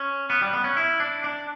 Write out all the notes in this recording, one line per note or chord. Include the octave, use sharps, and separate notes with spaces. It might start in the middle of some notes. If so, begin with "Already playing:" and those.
Already playing: C#4
B3
G3
B3
C#4
E4
D4
D4